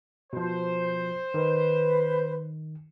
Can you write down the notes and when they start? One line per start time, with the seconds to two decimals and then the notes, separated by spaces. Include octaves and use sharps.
0.33 B2 F3 C5
1.34 D#3 B4